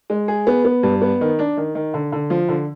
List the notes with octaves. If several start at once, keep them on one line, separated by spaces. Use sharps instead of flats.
G#3
G#4
B3
B3
G2
B3
D#3
D4
D#3
D#3
D3
D3
F3
D3